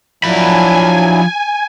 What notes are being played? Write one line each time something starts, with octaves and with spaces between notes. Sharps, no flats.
F3 F#3 D4 E4 G#5 B5